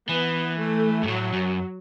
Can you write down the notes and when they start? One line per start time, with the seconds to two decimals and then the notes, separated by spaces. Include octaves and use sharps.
0.09 E3 B3
0.59 A3
1.03 G2
1.08 A2 F#3
1.33 F#2